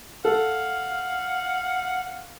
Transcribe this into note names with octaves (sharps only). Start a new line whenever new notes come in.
A4 F5 F#5